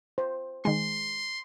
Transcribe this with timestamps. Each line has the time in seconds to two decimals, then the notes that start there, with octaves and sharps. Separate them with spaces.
0.18 C5
0.65 D#3 G#3 C6